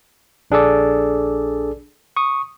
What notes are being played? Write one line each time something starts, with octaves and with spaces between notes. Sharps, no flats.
A#1 D4 G#4 A4 D5
C#6 D#6